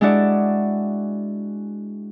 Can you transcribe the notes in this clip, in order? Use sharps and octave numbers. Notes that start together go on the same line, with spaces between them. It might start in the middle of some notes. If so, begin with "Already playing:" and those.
G#3 D4 E4 F#4 D5